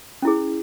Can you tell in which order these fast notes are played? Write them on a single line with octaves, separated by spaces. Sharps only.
C#4 E4 G#4